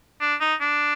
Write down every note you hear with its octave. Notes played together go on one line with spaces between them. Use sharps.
D4
D#4
D4